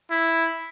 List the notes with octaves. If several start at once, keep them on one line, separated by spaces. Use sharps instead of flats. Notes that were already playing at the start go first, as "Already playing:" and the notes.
E4